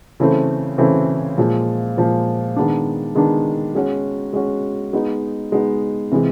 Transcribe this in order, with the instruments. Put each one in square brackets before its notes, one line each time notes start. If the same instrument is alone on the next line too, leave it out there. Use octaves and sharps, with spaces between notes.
[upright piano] C#3 E3 A3 C4 E4
C#3 E3 A3 C4 E4
A#2 F3 G#3
A#2 F3 G#3
D#3 G#3 B3 D4
D#3 G#3 B3 D4
G#3 C#4 F#4
G#3 C#4 F#4
G#3 B3 D#4
G#3 B3 D#4
C3 E3 G#3